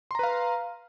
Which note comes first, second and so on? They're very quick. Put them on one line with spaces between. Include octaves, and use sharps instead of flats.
C6 A#5 B4 F5